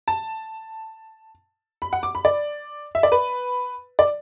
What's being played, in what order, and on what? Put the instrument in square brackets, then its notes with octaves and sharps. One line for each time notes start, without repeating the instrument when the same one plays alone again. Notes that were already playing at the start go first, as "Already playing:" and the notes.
[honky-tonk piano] A5
B5
F#5
D6
B5
D5
E5
D5
B4
D5